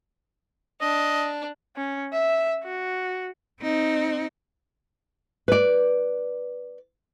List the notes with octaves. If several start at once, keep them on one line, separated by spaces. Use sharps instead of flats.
D4 D#5
C#4
E5
F#4
C4 D#4
B4 D5